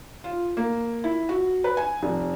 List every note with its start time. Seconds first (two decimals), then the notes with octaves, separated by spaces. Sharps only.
0.24 F4
0.57 A#3
1.04 E4
1.29 F#4
1.64 B4
1.77 G#5
2.03 F1